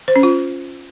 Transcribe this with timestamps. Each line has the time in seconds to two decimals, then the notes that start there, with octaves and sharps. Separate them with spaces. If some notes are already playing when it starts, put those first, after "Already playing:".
0.08 C5
0.16 C#4
0.23 F4